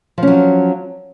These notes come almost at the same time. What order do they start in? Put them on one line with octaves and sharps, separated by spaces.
F3 C#4 F#3